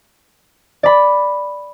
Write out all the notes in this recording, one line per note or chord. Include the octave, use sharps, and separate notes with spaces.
D5 B5